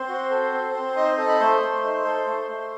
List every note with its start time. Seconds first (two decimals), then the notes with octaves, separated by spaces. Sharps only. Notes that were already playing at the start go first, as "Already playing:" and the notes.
Already playing: C4 C5 C6
0.09 F#4
0.30 A4
0.53 C4
0.75 C4
0.96 D#4 D#5 D#6
1.18 A4
1.28 B5
1.40 A3 C5 C6
1.62 A3
1.84 D#4
2.05 A4
2.27 A3
2.49 A3